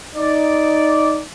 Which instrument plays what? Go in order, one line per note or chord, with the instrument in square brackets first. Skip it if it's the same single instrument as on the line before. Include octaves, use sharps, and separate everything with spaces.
[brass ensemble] D#4 D5